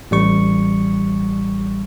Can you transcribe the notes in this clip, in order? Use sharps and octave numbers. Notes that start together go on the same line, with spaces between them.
A1 G3 C#6